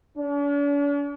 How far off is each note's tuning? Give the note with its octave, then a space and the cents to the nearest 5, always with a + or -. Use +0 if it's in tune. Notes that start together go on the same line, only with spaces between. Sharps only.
D4 -45